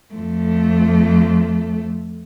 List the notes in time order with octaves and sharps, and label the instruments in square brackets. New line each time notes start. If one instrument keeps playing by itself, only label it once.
[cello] F2 A3